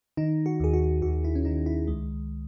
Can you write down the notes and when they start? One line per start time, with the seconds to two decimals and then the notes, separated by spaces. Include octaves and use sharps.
0.17 D#3 D#4
0.46 F#4
0.60 D#2 G#4
0.73 F#4
1.02 D#2 F#4
1.24 E4
1.35 C#4
1.45 D#3 D#4
1.66 E4
1.87 C#2 G#3